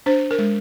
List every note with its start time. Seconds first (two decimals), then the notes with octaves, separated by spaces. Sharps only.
0.06 D4 C5
0.31 A#4
0.38 G#3